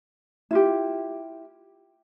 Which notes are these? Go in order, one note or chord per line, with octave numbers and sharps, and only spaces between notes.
E4 F4 G4